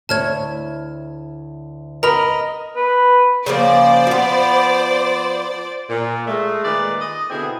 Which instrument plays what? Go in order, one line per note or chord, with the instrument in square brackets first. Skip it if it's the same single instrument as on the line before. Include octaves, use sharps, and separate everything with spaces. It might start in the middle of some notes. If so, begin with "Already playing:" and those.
[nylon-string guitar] D2 E4 C#5 [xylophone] A5 F6 G#6
[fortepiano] A#4 B5 [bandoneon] D#5 [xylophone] A#5 F7
[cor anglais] B4
[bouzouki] C#3 F3 A#3 [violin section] C5 D5
[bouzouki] F3 B3
[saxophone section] A#2
G#3 A3
A#2 D#3 G#3 B4 D5
D#5
B2 D3 C4 E4 G#4